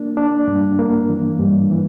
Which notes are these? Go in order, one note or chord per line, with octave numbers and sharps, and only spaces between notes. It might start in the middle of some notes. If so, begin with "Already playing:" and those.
Already playing: A#3 D4
D4
G2
A#3
E3
G2
E3